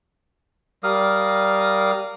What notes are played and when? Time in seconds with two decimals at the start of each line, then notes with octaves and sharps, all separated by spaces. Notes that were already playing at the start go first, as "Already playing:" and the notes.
0.84 G3 A#4 F5 D#6